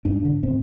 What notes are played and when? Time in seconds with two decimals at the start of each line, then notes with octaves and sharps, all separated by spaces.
0.05 G2 D4
0.25 D3
0.43 A2 C4